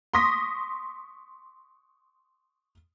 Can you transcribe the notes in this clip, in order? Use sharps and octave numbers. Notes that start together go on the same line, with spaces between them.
C6 C#6 D#6 A#6 B6